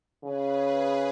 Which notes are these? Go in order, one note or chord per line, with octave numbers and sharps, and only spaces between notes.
C#3 G#4 B4